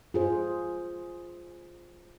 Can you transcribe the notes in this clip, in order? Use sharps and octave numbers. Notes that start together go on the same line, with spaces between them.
F4 G#4 C5